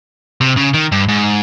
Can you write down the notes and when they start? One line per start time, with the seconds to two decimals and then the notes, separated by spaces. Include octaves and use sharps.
0.41 C3
0.57 C#3
0.74 D#3
0.92 G2
1.09 G#2